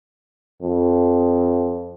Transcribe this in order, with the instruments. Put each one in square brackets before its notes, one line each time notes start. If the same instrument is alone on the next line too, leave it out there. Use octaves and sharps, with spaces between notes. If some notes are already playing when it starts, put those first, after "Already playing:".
[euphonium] F2